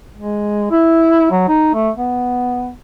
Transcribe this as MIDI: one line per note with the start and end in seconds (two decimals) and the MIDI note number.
0.16 0.69 56
0.71 1.29 64
1.31 1.47 54
1.48 1.71 63
1.74 1.90 57
1.97 2.71 59